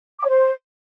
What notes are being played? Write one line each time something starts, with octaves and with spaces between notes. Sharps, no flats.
D6
C#5
C5